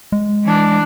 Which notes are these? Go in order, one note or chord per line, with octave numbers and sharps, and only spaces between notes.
G#3
E3 D4